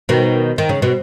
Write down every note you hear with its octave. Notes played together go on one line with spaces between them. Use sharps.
B2 D#3
D#3
C#3
B2